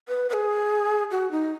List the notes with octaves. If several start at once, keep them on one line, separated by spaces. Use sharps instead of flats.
B4
B4
G#4
F#4
D#4